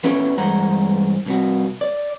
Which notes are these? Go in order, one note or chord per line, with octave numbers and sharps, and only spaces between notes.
B3 C#4 E4 G4 A4
G2 E3 G#3 C5 F#5 A#5
C2 C3 F#4
D5